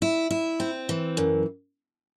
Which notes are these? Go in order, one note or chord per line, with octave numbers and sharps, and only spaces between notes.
E4
E4
C4
E3
F#2